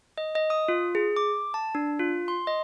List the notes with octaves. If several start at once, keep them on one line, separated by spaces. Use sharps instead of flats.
D#5
D#5
D#6
F4
G#4
D6
A5
D4
F4
C6
D#5